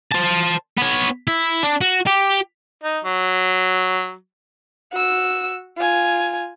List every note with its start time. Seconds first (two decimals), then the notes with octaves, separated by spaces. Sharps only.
0.12 C5 A5
0.77 B3 C#5
1.27 E4
1.63 D4
1.81 F#4
2.07 G4
2.84 D#4
3.05 F#3
4.92 F#4 E6
5.78 F4 G#5